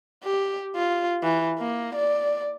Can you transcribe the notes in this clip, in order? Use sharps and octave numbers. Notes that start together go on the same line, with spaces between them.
G4
F4
E3
A#3
D5